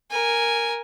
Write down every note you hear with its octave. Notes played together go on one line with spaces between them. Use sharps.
A#4 G#5